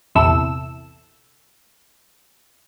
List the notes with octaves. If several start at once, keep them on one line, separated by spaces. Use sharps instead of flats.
A#1 E2 C3 E4 A4 E6